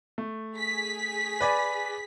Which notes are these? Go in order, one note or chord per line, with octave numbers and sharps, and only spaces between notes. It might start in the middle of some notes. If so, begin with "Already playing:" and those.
A3
G#4 B6
B4 D5 G#5